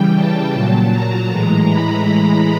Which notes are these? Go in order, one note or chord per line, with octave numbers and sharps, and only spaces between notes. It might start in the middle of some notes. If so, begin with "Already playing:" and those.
Already playing: C#3 E3 G3 G5
A5
A#2 F#3 A5
A#5
A2 E3 G#3 A#5
B5